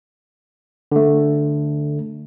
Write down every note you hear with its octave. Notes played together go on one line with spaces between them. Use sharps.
D3 A3